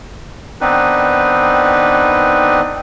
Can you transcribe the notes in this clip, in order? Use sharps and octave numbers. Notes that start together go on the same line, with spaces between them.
D#3 B3 C4 D4 D#4 B4